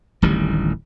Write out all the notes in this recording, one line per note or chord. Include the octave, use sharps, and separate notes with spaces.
D1 A1 D#3 G3